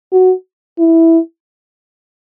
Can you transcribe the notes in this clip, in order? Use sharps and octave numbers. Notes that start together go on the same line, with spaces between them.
F#4
E4